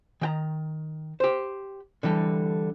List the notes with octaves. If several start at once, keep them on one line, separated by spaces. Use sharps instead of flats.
D#3 G5 A#5
G4 C5
D3 E3 G3 A4